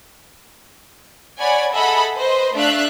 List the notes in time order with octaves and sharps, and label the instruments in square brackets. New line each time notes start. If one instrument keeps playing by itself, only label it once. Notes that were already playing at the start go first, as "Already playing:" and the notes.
[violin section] C#5 D5 F#5 G#5 B5
G#4 A4 D#5 E5 F#5 B5
B4 C5 D#5
A3 D4 E5 F5 F#6